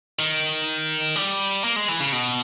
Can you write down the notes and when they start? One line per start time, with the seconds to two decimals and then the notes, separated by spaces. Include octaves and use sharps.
0.19 D#3
1.16 G3
1.64 A#3
1.76 G#3
1.88 E3
2.00 C#3
2.13 B2